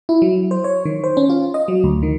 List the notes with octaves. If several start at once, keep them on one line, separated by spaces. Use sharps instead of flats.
E4
F#3
C5
C#5
D#3
C5
C#4
F4
D#5
F#3
D2
D#3